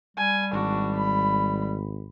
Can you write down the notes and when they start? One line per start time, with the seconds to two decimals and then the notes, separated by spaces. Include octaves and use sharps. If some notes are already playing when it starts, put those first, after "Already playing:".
0.17 G3 G#5
0.53 G#1 D4 F#4
0.95 B5